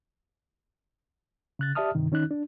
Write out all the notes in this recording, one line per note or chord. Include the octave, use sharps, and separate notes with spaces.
C#3 F#6 A6
G4 D5 E5 A5 D#6 F6
G2 C3 D#3
D#3 C#4 D#4 F#6
D4